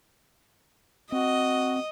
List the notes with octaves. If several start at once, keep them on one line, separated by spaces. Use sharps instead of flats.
C4 F#4 D#5